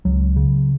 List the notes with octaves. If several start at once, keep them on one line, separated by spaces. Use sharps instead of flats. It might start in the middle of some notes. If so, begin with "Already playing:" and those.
C#2 F#3
C#3